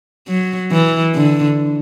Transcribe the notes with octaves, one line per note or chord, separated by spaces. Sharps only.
F#3
E3
D3